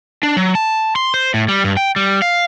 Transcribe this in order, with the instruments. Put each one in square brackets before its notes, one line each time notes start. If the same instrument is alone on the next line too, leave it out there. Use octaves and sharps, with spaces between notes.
[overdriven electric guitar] D4
F#3
A5
C6
C5
A2
G3
G2
G5
G3
F5